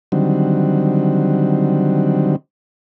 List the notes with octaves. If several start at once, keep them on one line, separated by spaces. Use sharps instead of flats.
D3 D#3 F#3 G3 C4